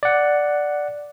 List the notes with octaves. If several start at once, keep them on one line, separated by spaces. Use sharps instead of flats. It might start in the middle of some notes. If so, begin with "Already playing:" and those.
D5 F#5